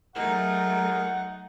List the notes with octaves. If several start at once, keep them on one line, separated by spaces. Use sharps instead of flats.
F#3 A3 D#4 G#4 A#4 F#5